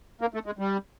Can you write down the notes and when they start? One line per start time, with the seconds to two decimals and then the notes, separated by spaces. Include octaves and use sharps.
0.21 A#3
0.34 A3
0.46 G#3
0.59 G3